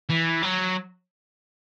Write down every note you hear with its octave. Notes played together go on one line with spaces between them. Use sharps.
E3
F#3